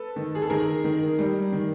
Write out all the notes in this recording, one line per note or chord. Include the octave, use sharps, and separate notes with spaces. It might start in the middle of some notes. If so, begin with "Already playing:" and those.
Already playing: A4 B4
D#3
G#4
A4
D#3 G#4 A#4
D#3
G3
D#3